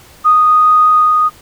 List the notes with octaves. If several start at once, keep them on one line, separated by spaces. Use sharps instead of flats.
D#6